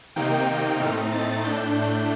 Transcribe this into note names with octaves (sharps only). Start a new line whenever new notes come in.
C3 D#3 A#3 D#4 G5
A2 A3 C4 D#4 F6
A6
A2 A3 D4 G6